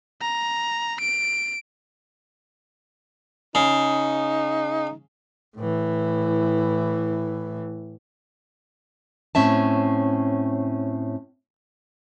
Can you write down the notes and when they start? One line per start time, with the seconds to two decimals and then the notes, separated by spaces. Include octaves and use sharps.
0.22 A#5
1.00 D7
3.55 C#3 D#4
5.56 A2 E3
9.35 A2 C4 C#4 E5 A5